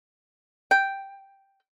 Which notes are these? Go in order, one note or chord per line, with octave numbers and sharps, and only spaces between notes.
G5